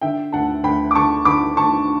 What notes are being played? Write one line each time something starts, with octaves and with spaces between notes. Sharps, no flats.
D3 E5 G5
D2 F#5 A5
D2 G5 B5
D6
D3 A5 C#6
D3 B5 D6
D2 A5 C#6